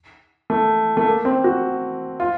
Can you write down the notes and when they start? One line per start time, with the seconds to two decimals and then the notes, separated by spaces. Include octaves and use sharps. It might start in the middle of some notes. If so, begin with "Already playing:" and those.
0.50 A3
0.97 A3
1.06 A#3
1.25 C4
1.44 F#4
2.20 F4